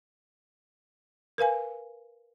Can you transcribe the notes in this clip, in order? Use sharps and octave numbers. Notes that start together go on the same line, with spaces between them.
A#4 B4 F5 G#5